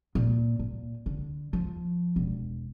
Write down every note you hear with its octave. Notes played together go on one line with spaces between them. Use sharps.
A#2
A#2
D3
F3
E1